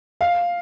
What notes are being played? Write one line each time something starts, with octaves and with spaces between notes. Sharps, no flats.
F5